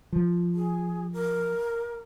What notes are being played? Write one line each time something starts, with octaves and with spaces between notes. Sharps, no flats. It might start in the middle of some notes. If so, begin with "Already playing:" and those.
F3
G#4
A#4